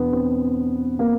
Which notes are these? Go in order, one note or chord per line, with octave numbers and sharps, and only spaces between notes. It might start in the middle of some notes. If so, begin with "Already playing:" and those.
Already playing: E2 B2 B3 D4
C4
A#3